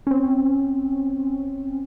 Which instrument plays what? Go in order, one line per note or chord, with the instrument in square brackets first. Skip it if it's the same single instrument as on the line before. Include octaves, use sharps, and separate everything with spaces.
[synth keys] C4 C#4